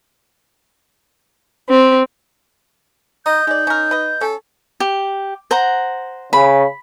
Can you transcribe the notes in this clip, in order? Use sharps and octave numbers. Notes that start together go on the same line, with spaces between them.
C4
D#4 D#5 G6
G#3 D#4 D5
C#4 A#4
B4 D#5
C#4 A4
G4
C5 F#5 A#5
C#3 B5